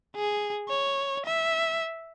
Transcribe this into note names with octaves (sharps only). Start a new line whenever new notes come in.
G#4
C#5
E5